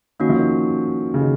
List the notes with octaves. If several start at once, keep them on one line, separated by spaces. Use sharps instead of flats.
D#3 A#3 C#4 F#4
F3
D#3
C#3
D#3